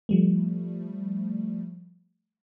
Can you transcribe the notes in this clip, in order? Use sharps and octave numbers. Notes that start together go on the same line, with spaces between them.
F3 G3 A3